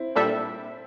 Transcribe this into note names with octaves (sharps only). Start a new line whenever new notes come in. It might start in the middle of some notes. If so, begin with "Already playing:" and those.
Already playing: C4 E4
A#2 G3 D4 A4 E5